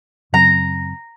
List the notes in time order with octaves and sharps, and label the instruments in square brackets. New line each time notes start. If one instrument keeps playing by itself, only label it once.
[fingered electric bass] F#2 C#3 F#3 C4 [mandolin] A#5